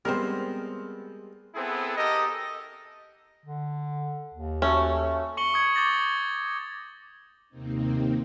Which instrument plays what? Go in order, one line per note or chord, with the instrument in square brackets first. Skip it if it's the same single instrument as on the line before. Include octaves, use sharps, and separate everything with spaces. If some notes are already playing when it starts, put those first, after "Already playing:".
[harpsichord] G3 G#3 [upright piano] B3 C4 [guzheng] A#4 C5
[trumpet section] B3 C4 E4 G#4 A4
G4 A4 A#4 D#5
[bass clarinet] D3
D#2
[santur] A3 F#4 [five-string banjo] C#4
[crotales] C#6 C#7 F#7 G7
D#6 G#6 C#7
C#6 D6 G6 A6 A#6 F#7
[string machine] D#2 C3 A#3 C4 D#4